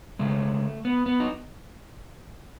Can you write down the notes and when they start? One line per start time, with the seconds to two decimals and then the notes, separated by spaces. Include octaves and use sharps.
0.19 C#3 G#3 A3
0.85 B3
1.06 B3
1.20 D#4